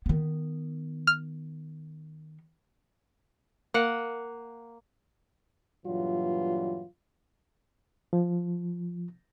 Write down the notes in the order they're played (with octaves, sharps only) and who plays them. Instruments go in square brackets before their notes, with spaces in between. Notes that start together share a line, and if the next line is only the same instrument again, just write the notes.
[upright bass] D#3 B3
[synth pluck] F6
[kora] A#3 F#5
[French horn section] G2 A#2 E3 F#3 F4
[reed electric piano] F3